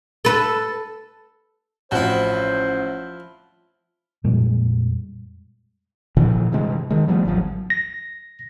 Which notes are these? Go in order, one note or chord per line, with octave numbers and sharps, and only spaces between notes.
A4 B4
A1 F3 C4 E4 F#4 C5
F2 A#2 G3 G#3
A#2 D3 E3 F3
G2 C3 E3 G#3
D#3 G#3
F3 G3 A3 B3
G#1 D2 F3 F#3
A#6